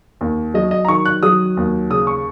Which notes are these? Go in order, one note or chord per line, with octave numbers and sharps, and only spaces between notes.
D#2
F#3 D#5
D#5
A#5
D#3 C#6
F#6
F#3 D#6
D#2
C#3 D#6
C#6